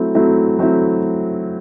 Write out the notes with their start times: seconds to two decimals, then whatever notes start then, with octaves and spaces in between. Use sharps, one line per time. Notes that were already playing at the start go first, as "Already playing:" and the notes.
Already playing: F#3 A3 C4 E4
0.15 F#3 A3 C4 E4
0.59 F#3 A3 C4 E4